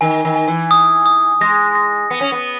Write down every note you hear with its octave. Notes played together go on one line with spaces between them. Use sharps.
D#3 G#5
D#3
G#5
E3
D#6
D#6
G#3 A#6
A#6
B3 C#7
C#4
B3